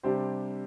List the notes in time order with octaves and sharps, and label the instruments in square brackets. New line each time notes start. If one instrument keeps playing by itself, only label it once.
[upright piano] C3 G3 D4 G4 C5